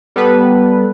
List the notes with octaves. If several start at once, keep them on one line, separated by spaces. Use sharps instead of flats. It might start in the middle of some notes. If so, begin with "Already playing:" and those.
G3 B3 A4 B4